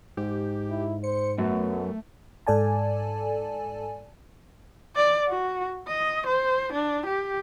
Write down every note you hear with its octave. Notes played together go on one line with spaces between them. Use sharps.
G#2 G4
E4
C5 C#7
F#2 A3 B3
G#2 A4 D5 G#5 A5
D5
F#4
D#5
C5
D4
G4